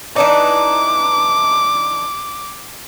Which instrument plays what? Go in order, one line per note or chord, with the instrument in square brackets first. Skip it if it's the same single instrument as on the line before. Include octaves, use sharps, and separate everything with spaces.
[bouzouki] E3 D4 D#4 [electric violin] D6